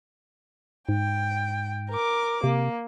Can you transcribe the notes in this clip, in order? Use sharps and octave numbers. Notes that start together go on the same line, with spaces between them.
G#2 G5
A#4 D6
C3 A#3